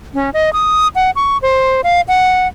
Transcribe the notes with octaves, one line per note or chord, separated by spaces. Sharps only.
C#4
D#5
D#6
F#5
C#6
C5
F5
F#5